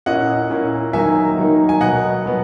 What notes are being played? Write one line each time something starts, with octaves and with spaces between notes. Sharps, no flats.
A#2 A#3 C#4 E4 D#5 F#5
A#2 A#3 C#4 E4
D#3 F#3 A#3 D#4 E5 G#5
D#3 F#3 A#3 D#4
G#5
B2 F#3 B3 D#5 F#5
B2 F#3 B3